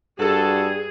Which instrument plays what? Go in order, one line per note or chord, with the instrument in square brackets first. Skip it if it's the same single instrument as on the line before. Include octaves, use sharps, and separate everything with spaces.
[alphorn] G2 [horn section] F#4 A4 [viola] G#4